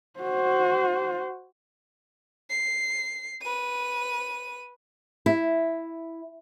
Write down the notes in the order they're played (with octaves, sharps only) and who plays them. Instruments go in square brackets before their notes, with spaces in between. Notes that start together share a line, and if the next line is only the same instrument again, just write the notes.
[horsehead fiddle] F#4 C5
[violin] C7
B4 D#7
[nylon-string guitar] E4